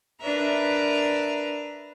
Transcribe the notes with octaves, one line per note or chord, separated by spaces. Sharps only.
D4 A#4 B4 E5 A#5